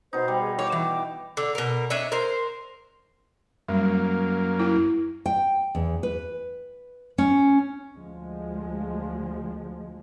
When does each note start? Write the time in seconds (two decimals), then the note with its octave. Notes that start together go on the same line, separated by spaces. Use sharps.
0.13 B2 D#4 C5
0.28 G3
0.41 G#4
0.59 C#5 D6
0.72 E3
1.37 D3
1.55 B2 A#4
1.90 D4 C#5 D#5 E5
2.12 A#4 C5
3.69 F#2 G3 A#3
4.59 E4
5.26 G5
5.75 E2
6.03 B4
7.18 C#4
7.95 D2 F3 G#3